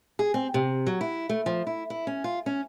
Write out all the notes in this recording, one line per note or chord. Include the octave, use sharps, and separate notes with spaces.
G#4
C4
C3
F#3
E4
A3
F3
E4
E4
C#4
F4
C#4